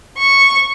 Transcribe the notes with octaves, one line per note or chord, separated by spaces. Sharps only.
C#6